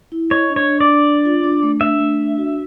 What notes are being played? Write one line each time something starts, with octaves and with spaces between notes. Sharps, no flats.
E4
C#5 D#5
D4
C#5
D4
D5
D4
D4
F4
D4
A3
D4 E5
A3
D4
F#4